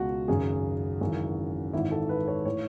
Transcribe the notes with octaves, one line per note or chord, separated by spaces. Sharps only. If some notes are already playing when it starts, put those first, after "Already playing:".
Already playing: C#2 B2 F#4
G#1 F#2 C#3 G#4
G#1 F#2 C#3 E3
G#1 G#2 E3 E4
A4
B4
C#5
A2 E3 C#5